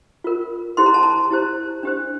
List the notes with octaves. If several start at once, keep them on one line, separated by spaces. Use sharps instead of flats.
F4 A#4
E4 G4 C5 C6
A#5
A5
A#5
E4 G4 C5
D4 G4 C5